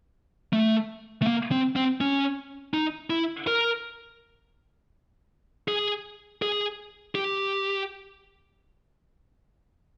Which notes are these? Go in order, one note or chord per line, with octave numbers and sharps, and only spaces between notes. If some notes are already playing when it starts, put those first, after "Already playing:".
A3
A3
A#3
C4
C4
C#4
D#4
E4
A#4
G#4
G#4
G4